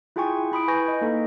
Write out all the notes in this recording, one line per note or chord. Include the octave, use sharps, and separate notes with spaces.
E4 F4 G#4 G5 G#5 C#6
E4 B5 D#6 D7
B4 G#5 C#6 G6 A#6
D#5
A#3 D#4 A4